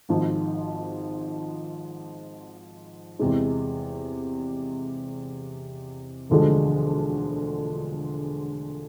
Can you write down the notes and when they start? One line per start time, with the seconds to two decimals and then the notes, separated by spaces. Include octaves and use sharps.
0.09 G#1 G#2 F3
3.19 E2 C3 G#3
6.30 E1 D2 D3 F3 G#3